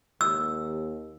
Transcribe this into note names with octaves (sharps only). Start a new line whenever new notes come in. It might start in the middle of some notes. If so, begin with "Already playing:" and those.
D#2 E6